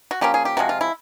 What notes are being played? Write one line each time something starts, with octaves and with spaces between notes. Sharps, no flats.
F#4
F3 A#3 C#4 G4
G#4
G4
C3 F3 G#3 F#4
F4
E4